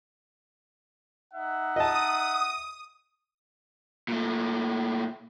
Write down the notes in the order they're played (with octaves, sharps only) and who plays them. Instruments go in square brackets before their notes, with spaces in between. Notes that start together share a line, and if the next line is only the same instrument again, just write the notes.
[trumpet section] D#4 E5 F#5
[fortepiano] D#5 A5 [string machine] D#6
[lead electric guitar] A#2 A3